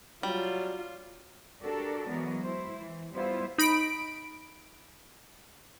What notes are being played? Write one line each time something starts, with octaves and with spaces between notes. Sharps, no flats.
F#3 G3 F4
D4 F#4 G4 A4 A#4 D5
E3 F#3 G#3 B3 A#4
E4 C5
E3
G3 B3 E4 F4 C5
D#4 B5 D7